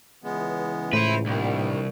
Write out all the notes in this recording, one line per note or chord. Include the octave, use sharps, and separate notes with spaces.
C#2 E3 G#3 B3
A2 E4 B4 C5
C2 A#2 D#3 E3 G3 D4